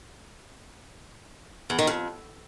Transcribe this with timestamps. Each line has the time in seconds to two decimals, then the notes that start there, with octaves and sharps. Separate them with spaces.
1.70 E2
1.79 D#3
1.87 F2